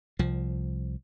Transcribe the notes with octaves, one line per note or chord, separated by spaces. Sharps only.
C2 F3